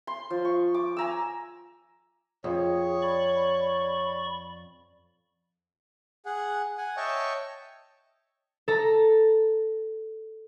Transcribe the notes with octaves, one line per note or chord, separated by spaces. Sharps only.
C6
F3
C#6
D6
G#5 A#5 E6
F2 G#4 C#5
D5 B5 C#6
G#4 F#5
F#5 G#5
C#5 D#5 E5 G5 A5 C#6
A4 A#5